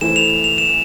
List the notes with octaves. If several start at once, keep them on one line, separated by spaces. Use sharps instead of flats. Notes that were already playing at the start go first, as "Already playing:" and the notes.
E3 A3 E4 A4 C5 E7
F7
F7
E7